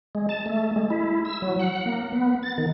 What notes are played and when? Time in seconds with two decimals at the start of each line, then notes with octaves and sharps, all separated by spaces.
0.15 G#3
0.29 A5
0.46 A3
0.76 G#3
0.90 E4
1.25 E6
1.42 F#3
1.59 F#5
1.86 A#3
2.12 B3
2.43 A6
2.58 D#3